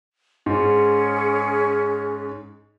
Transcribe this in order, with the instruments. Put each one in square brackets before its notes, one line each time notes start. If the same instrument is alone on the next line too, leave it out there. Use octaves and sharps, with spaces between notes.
[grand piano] G#2 [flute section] C#4 G#4